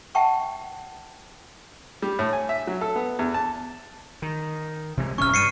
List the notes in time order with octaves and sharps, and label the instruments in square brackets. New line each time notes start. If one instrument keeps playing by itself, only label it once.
[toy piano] E5 F#5 G5 A5 C#6
[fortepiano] G3
A2
G#5
E5
F#3
A4
B3
E2
A5
[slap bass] D#3
C3 E3 G#3
[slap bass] F1 C3 C#4 [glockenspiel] C#6 F6
[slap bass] G2 G3 [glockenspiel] C7 C#7 D#7